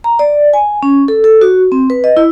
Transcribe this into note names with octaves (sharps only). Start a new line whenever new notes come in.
A#5
D5
G#5
C#4
A4
A4
F#4
C4
B4
D#5
E4